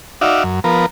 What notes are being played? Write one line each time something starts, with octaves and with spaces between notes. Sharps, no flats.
D#4 F#4 D5 E5 F5
F#2
F3 B3 A#4